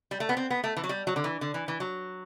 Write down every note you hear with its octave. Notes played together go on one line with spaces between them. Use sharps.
G3
A3
B3
C4
B3
A3
E3
F#3
G3
F#3
D3
E3
D3
E3
E3
F#3